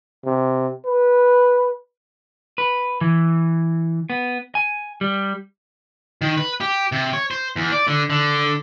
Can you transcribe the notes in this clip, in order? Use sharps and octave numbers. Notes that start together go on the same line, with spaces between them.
C3
B4
B4
E3
B3
G#5
G3
D#3
B4
G4
C3
C#5
C5
E2
D5
D3
D3